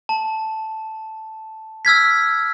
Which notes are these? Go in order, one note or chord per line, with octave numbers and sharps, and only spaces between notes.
A5
E6 F6 G#6 B6